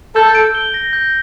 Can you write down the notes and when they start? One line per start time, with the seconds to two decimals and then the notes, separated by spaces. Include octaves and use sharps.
0.16 A4 G6
0.35 D7
0.55 G7
0.74 A#6
0.93 G6